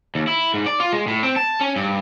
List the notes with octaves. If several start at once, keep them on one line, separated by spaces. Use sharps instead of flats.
D#2
E4
G#2
D5
F4
G#3
A2
C4
A5
C#4
G2